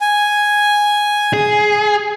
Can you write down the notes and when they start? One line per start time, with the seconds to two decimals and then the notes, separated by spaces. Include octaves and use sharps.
0.01 G#5
1.33 G#4